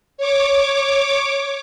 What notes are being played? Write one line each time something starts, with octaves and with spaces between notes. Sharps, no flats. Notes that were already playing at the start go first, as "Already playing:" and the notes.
C#5 D6